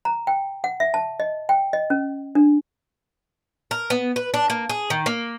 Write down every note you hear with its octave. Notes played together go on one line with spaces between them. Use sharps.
A#5
G5
F#5
E5
A5
D#5
G5
D#5
C#4
D4
A#4
B3
B4
D4
A#3
G#4
D#3
A#3